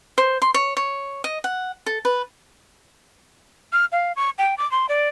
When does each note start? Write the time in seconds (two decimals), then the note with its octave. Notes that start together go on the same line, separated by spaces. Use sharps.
0.18 C5
0.42 C6
0.54 C#5
0.77 C#5
1.24 D#5
1.44 F#5
1.86 A4
2.05 B4
3.73 F6
3.92 F5
4.16 C#6
4.38 G5
4.58 D6
4.71 C6
4.89 D5